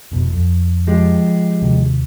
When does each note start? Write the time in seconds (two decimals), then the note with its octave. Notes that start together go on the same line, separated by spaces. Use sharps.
0.11 F1 B2
0.33 F2
0.87 F3 G#3 G4
1.62 D#2 C3